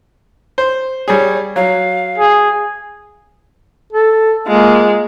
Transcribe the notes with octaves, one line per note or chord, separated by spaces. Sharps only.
C5
G3 G#4 C#5
F#3 F5
G#4
A4
G#3 A#3 F4